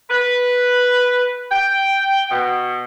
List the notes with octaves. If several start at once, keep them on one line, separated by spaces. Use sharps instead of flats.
B4
G5
B2